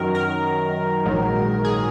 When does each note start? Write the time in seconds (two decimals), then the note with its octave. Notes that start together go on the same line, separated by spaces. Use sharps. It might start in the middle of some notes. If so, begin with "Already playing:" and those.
Already playing: F#2 D#3 F#3 A#4
0.15 A#4
1.05 A#1 G#2 D#3 F#3
1.65 G#4